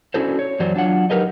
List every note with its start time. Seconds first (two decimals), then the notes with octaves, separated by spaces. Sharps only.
0.14 C#4 D4 E4 F#4 A4 C5
0.39 C#5
0.59 F#2 E3 F#3 C5 D5
0.74 F#3 D4 F4 F#5
1.10 F#3 D#4 G4 A#4 B4 D#5